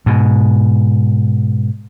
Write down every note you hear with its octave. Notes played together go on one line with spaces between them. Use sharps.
G#2 B2